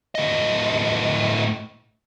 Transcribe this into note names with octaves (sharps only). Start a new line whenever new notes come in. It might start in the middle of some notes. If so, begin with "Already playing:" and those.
A2 D#5